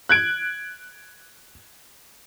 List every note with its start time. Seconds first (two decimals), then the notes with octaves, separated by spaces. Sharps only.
0.09 F#6 G#6 D7